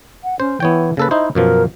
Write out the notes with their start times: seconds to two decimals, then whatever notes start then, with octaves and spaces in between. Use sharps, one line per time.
0.24 F#5
0.40 C#4 C5
0.60 E3 B3 C#5 G5
0.97 C#3 A#3 A4 B4
1.11 D#4 E4 C5 D#5
1.35 F#2 B2 F3 A#4